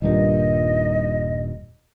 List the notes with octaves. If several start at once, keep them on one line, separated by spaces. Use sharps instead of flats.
D#1 G2 A#2 D#5